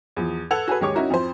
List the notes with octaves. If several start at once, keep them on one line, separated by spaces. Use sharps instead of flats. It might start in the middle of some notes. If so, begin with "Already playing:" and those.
E2 F3
A4 B4 F#5 G#6 F7
F#4 G#4 A4 B4
D#2 G#3 G4 C#5 C#6 D6
C#4 D#4 E4 F#4 A#4
F2 F3 C5